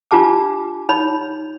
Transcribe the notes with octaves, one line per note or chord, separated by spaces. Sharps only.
D4 F4 G4 A5 D6
D#4 C#5 B5